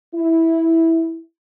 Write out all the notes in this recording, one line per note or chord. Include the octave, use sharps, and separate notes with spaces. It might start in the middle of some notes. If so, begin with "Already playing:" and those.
E4